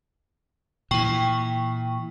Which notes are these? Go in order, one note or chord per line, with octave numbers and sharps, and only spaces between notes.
A#2 E3 G5 C#6